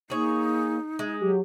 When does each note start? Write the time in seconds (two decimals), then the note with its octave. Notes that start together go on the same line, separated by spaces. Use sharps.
0.10 A#3 D#4 G#4 C#5
0.99 G#3
1.21 F#3 G4